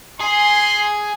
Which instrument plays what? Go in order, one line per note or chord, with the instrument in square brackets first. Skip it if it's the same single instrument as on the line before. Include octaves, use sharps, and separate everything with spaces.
[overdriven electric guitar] G#4 [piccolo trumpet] C6